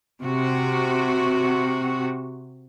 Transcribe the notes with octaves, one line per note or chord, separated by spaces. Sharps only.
C3 F#4